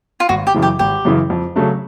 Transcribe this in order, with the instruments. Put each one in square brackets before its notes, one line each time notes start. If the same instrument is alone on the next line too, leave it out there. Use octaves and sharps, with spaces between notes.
[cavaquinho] F4
[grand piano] G#1 [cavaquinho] F#4
[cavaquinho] G4
[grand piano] F#2 C#3 E3
[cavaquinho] G4
[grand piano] G#1 [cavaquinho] G4
[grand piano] F#2 C#3 E3
F2
C#3 F#3 A3 D4